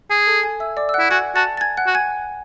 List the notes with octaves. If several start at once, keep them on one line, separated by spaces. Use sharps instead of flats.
G#4 G#5
A4 A5
G#5 G#6
E5 E6
D5 D6
E6
E4 F#5 F#6
F#4 G#5 G#6
F#4 A5 A6
A6
G#5 G#6
F#5 F#6
F#4
G#5 G#6